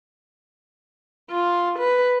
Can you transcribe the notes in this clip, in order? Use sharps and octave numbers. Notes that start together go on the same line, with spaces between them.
F4
B4